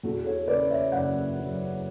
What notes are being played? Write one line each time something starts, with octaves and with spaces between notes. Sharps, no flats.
E2 F#4 A4
A4 C#5
C#3 B4 D5
C#5 E5
F#1 D5 F#5
F#3